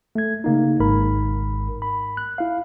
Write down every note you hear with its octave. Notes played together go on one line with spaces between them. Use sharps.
A3 G#6
C#3 A#3 D#4
G#1 G#2 A#4 B5
B5
F#6
E4 F5